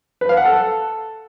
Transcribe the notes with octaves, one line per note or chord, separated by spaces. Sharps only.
B4
F5
F#5
A4